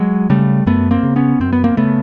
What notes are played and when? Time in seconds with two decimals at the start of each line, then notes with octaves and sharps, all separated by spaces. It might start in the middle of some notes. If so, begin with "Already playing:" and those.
Already playing: F#3 G#3
0.30 C#3 G3 A3
0.67 F#2 A3 B3
0.91 A#3 C4
1.03 C#3
1.16 B3 C#4
1.40 F#2 C4
1.53 B3
1.64 A#3 C4
1.77 C#3 A3 B3